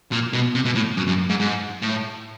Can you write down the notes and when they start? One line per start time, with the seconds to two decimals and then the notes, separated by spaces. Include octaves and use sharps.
0.12 A#2
0.33 B2
0.55 C3
0.65 B2
0.75 A2
0.97 F#2
1.07 F#2
1.29 G#2
1.40 G#2
1.82 A2